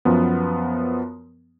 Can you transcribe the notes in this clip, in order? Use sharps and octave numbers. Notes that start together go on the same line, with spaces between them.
F#2 F3 B3